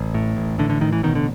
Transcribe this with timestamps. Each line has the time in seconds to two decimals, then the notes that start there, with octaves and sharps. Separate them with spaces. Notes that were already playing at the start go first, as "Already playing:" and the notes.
Already playing: A1
0.14 A2
0.37 A1
0.59 A2 D3
0.70 D3
0.81 A1 D#3
0.92 E3
1.03 B2 D#3
1.15 D3